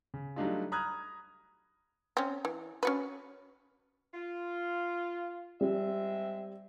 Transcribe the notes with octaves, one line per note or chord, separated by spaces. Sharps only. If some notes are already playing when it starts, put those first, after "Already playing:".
C#3
F#3 G3 A3 D4 D#4 F4
A#5 B5 D#6 F6 F#6 G#6
C4 C#4
E3
C#4 F#4 B4
F4
G3 G#3 C4 E5